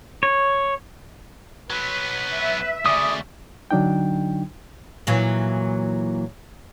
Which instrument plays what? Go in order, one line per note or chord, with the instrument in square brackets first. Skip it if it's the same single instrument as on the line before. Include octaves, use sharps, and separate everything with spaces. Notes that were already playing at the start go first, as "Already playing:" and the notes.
[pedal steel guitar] C#5
[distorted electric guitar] F#3 B3 [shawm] B4
[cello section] E5
[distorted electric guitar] D2 C#3 [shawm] D5 [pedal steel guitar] D#6
[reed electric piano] D3 F#3 D4 D#4 G5
[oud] A#2 E3 F#3